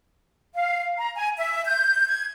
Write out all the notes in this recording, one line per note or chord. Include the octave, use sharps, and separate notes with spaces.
F5
A#5
G#5
E5
G6
G#6